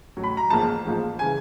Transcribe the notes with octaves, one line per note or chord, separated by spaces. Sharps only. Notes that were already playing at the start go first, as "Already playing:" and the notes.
A1 A2 F#3
B5
A#5
A1 G#2 F3 A#3 A5
A1 G#2 F3 A#3
C#3 E3 G#5